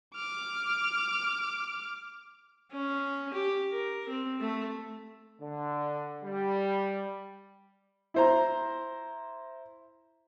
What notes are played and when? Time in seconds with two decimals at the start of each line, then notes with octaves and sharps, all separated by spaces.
0.15 D6 F6
2.72 C#4
3.33 G4
3.71 A#4
4.08 C4
4.40 A3
5.40 D3
6.22 G3
8.14 E4 C5 A#5